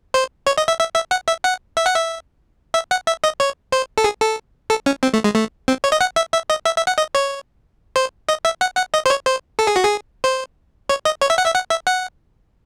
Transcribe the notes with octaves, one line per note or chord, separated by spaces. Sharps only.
C5
C#5
D#5
E5
E5
E5
F#5
E5
F#5
E5
F#5
E5
E5
F#5
E5
D#5
C#5
C5
A4
G#4
A4
A4
C#4
C4
A3
G#3
A3
C4
C#5
D#5
F#5
E5
E5
D#5
E5
E5
F#5
D#5
C#5
C5
D#5
E5
F#5
F#5
D#5
C5
C#5
C5
A4
G#4
F#4
G#4
C5
C#5
D#5
C#5
E5
F#5
E5
F#5
E5
F#5